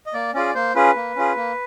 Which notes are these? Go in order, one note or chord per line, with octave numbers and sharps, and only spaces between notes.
D#5
A#3 D5
C#4 F4 G#4 D5
A#3 C5
C#4 F4 G#4 B4
A#3
C#4 F4 G#4
A#3